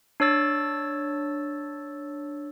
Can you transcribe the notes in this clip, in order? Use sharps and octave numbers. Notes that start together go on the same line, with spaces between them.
D4 C#5 E6 A6